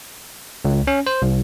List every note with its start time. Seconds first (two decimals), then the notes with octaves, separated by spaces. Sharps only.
0.65 C#2
0.87 C#4
1.07 C5
1.22 C2